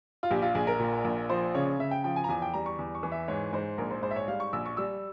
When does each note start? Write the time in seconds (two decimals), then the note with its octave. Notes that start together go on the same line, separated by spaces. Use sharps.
0.23 F4
0.31 A#1 G4
0.42 F4
0.55 A#1 G#4
0.67 A#4
0.79 A#2
1.05 A#1
1.30 F3 C5
1.55 C#3 C#5
1.79 C#3 E5
1.91 G5
2.04 F3 G5
2.16 G#5
2.24 A#5
2.29 E2 G#5
2.42 G5
2.54 G3 A#5
2.66 C#6
2.79 E2
2.95 C#6
3.03 E3
3.12 E5
3.28 G#2 C#5
3.53 G#2 C5
3.78 A#1 A#4
3.91 C5
4.02 G#2 C5
4.11 E5
4.16 C#5
4.28 G3 F5
4.40 C#6
4.53 A#1 E6
4.66 C#6
4.77 G3 E6